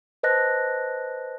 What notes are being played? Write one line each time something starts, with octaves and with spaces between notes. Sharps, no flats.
B4 C5 D#5 A5 F#6 A#6